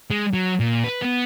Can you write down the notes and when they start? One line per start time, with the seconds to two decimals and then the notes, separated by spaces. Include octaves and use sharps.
0.10 G#3
0.34 F#3
0.60 A#2
0.84 B4
1.02 B3